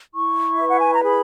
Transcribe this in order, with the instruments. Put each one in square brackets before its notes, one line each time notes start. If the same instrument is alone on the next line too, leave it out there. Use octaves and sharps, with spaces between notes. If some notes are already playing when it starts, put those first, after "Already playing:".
[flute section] E4 C#6
B4 E5
F#5
G#5
A#5
G#4 B5